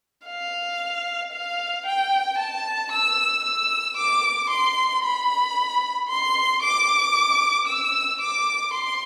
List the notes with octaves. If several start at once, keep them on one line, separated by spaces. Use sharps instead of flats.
F5
F5
G5
A5
E6
E6
D6
C6
B5
C6
D6
E6
D6
C6